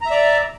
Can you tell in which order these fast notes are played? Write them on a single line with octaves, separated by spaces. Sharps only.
A#5 E5 D5